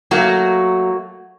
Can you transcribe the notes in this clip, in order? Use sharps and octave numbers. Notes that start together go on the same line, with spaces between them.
F#3 A3 A#3 F#4